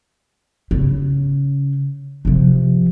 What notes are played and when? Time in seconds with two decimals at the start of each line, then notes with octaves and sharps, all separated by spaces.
0.71 C#3
2.25 C3 F3